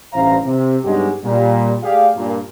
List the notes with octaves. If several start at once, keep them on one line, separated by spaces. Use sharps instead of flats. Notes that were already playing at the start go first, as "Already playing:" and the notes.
A1 D2 G2 C5 F5 A#5
C3
G2 F#3 G#3 B3 D#4 G4
A#2 G3
A3 G4 G#4 D5 F5
G2 A#2